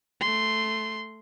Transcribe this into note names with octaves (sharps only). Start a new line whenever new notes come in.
A3 C6